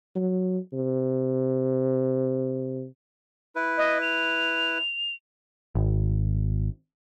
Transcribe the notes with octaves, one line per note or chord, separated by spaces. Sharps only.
F#3
C3
E4 B4
D#5
F7
G#1